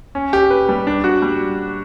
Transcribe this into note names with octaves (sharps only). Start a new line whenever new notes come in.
C#4
G4
B4
G3
D4
F#4
G3